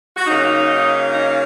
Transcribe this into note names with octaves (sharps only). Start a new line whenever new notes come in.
F#4
C#3 F#3 A#3 D#4
D#4